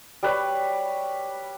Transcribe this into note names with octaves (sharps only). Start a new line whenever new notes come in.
G3 B4 C#5